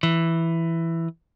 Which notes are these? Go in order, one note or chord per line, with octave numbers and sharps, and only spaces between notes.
E3